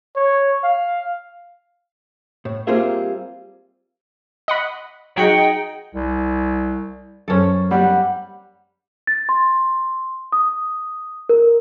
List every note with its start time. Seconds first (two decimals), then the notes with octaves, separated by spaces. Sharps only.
0.16 C#5
0.64 F5
2.45 A2
2.67 G3 A#3 C4 F4 G#4 E5
4.48 D#5 F#5 B5
5.17 F#3 D#4 G#4 F#5 G5
5.95 C2
7.28 F#2 C#4 A4 C5
7.71 G3 F#5
9.07 A6
9.29 C6
10.32 D#6
11.29 A#4